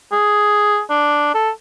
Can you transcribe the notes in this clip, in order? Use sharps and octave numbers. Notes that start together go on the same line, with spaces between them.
G#4
D4
A4